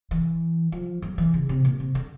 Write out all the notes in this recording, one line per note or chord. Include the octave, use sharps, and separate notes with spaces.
E3
F3
F#3
E3
C#3
C3
A#2
C3
D3